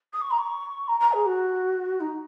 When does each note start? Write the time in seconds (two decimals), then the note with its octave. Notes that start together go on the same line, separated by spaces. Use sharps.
0.13 D#6
0.21 C#6
0.30 A#5
0.38 C#6
0.88 A#5
1.00 A#5
1.12 G#4
1.25 F#4
2.00 D#4